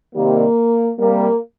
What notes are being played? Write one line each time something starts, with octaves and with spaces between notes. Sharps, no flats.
C3 D#3 G3 A#3
C3 G3 A#3